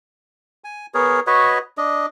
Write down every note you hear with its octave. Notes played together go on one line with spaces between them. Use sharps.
G#5
B3 G#4 A#4 C#5
F#4 B4 C#5 D#5
D4 D#5